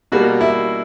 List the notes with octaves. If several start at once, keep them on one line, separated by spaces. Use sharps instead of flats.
B2 G3 A#3 F#4
E4